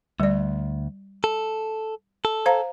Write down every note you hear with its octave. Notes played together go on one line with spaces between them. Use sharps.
D2 G3 D5
A4
A4
C5 F5 A#5